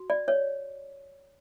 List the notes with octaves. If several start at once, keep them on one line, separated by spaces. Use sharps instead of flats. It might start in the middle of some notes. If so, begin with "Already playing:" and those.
Already playing: F#4
D5
C#5